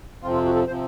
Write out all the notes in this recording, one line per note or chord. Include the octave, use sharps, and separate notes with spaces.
F2 C3 F3 C4 F4
F4
F#4
A4
C3 F3 C4 C5